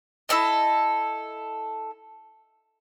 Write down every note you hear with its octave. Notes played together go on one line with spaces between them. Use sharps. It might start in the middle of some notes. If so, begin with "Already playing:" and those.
E4 A4 D5 D#5